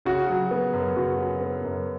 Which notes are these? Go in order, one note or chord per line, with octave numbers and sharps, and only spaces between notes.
C#3 F#4
F#3
B3
F#2
C#3 F#4
F#3
B3
F#2